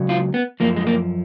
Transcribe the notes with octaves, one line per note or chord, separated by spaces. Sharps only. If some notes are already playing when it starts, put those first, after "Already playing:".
Already playing: C#2 C#3 F#3
F4
B3
F#2 F3 A#3
G#3
A#3